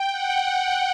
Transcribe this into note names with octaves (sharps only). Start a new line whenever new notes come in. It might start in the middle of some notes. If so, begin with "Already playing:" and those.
Already playing: G5
F#5